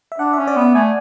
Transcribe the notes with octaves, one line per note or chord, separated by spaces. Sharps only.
E5
D4 F#5
C#4 E5
D5
B3 F#5
A3 G#5